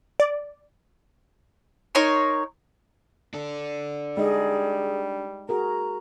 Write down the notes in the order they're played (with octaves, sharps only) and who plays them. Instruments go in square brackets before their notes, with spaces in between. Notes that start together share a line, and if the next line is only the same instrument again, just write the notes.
[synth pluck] D5
[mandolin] D#4 A#4 C#5 C6
[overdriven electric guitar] D4 A4
[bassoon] G3 [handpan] G#3 D#4 D#5 [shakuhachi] G#4
[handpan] F#4 G#4 A#4 [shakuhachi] A#5